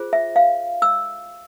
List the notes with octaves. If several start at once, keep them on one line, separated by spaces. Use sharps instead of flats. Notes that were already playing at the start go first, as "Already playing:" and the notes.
Already playing: F4 G#4 C5
E5
F5
E6